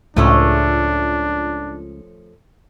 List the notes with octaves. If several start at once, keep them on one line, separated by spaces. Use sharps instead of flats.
C#2 A2 F3 A3 C#4 D4